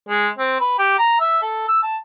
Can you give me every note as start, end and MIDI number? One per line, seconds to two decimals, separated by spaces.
0.09 0.28 56
0.38 0.60 60
0.60 0.76 71
0.79 0.98 67
0.99 1.15 82
1.20 1.40 76
1.42 1.67 69
1.68 1.79 88
1.83 1.96 81